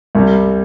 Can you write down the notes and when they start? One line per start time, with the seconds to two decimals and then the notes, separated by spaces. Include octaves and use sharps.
0.15 C2 C3 G3